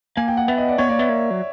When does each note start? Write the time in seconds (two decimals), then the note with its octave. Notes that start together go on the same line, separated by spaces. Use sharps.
0.17 A#3 G#5
0.28 G5
0.37 F#5
0.48 B3 E5
0.58 D#5
0.68 D5
0.78 B3 C#5
0.89 A#3 D5
0.99 B3 E5
1.09 A#3
1.31 F#3